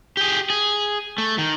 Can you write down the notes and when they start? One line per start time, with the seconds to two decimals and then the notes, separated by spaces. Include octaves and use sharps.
0.17 G4 G#4
0.50 G#4
1.18 A3
1.38 D#3